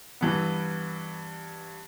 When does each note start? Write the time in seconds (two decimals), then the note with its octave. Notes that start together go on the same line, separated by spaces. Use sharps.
0.21 G2 E3 B3